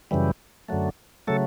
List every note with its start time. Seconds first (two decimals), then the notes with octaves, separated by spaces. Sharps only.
0.11 F#2 C#3 E3 G3
0.68 F#2 D3 F#3 A3
1.27 C#3 F#3 A3 A4